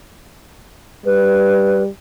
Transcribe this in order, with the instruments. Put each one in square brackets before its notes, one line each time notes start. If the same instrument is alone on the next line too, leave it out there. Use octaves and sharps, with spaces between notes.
[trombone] G3 [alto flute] B4